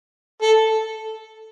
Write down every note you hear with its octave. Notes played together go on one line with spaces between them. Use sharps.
A4